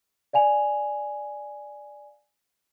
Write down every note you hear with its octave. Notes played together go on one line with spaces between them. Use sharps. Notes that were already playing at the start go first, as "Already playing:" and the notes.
D5 F5 G#5 F7